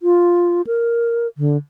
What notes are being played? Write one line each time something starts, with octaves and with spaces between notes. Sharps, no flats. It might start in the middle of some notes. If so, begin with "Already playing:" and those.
F4
A#4
D3